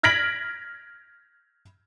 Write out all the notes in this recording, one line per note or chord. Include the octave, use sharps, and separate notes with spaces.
F6 G#6 A#6 B6 D7 F#7